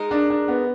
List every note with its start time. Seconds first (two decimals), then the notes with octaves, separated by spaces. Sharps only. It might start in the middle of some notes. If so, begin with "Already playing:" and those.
Already playing: G#3 D#4 A#4
0.11 D4
0.30 D4
0.48 B3